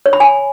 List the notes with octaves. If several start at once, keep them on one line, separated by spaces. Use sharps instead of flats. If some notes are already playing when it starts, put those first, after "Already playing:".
C#5
B5
G#5